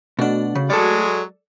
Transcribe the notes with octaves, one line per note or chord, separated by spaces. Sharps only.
B2 A3 D4 F#4
C#3
F#3 G#3 A4 D5